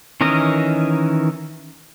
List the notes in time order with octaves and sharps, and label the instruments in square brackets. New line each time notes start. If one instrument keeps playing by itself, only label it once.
[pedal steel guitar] D#3 E3 C#4 A#4 D#5